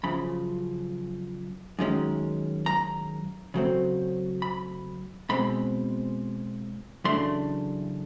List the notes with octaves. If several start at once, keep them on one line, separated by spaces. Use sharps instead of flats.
F#2 C#3 F3 B5
F#2 D#3 G#3 C#4
A#5
C#3 F#3 A3 C4
B5
B2 G#3 C4 B5
F#2 C#3 E3 A3 D4 C6